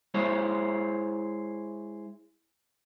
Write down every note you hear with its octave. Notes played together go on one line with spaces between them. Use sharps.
G#3 E4 C5 C#5